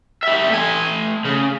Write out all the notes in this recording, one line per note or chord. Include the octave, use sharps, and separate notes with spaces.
G3 E5
A3 G#5
C#3